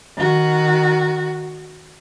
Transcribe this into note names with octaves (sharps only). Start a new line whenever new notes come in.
D#3 F#4